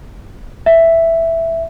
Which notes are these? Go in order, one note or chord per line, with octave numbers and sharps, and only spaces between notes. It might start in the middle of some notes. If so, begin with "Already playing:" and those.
E5